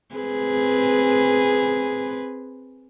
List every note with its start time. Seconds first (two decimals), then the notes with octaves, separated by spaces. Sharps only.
0.15 C4 G#4 B4